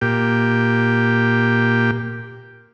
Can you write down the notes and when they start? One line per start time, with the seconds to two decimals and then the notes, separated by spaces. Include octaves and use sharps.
0.01 A#2 G4